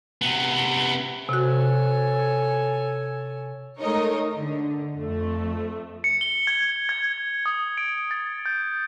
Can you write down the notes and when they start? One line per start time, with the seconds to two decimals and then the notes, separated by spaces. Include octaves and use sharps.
0.22 C3 B3
1.29 C3 F#4 A4 C#5 G#5
3.78 G#3 A3 D#4 A#4 C#5 D#5
4.33 D3
4.95 F2 A3
6.04 C#7
6.21 G7
6.47 G#6
6.89 G#6
7.46 D#6
7.78 D7
8.11 A6
8.46 G6